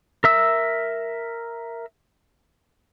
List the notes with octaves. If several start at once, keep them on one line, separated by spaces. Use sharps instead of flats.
A#4 E5 E6